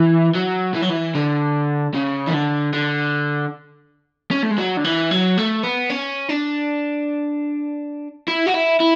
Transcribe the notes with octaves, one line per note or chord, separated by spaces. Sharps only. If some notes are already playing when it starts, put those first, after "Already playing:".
Already playing: E3
F#3
E3
F#3
E3
D3
C#3
E3
D3
D3
C#4
A3
G#3
F#3
D3
E3
F#3
A3
B3
C#4
D4
E4
F#4
E4
E4